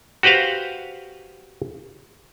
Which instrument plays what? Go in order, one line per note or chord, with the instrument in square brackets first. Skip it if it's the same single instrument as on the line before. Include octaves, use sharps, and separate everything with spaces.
[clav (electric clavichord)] F#4 G4 B4 C5 F5